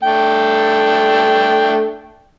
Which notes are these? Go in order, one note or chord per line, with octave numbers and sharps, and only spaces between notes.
A3 D4 G5